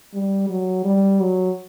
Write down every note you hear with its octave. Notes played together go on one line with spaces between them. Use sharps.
G3
F#3
G3
F#3